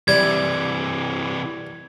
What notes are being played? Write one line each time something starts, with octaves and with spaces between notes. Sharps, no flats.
C3 E3 G3 E4 G#6